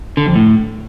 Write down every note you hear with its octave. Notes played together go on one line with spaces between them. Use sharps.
D3
F2
A2